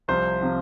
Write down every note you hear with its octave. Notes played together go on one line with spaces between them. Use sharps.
C2 C3 F3 C5
C3 F3